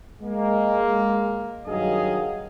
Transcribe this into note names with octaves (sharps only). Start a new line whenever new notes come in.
G#3 A#3
G2 D#3 F#3 G#4 D#5 F5